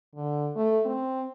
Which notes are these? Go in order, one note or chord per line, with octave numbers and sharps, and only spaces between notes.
D3
A3
C4